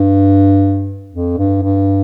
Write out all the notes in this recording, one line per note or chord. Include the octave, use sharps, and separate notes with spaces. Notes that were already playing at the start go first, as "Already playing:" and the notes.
Already playing: G2
F2
G2
G2